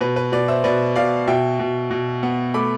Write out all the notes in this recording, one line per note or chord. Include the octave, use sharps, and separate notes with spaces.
B2 B4
B4
B2 B4 D5
C5 E5
B2 B4 D5
B2 D5 F5
B2 E5 G5
B2
B2
B3
A3 B5 D6